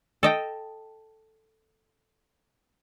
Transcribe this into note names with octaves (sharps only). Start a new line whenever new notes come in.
A4 D#5 G5